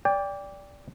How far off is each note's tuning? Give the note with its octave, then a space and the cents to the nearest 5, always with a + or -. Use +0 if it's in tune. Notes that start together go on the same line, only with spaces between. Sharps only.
D5 -15 G5 +20